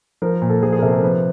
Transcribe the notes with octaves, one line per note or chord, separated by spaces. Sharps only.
F3 A#4
A#2
A4
F3 G#4
G#4
A#4
C3 A4
A#4
F3 B4